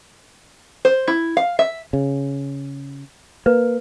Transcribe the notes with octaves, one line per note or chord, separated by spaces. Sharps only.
C5
E4
F5
E5
C#3
A#3 B4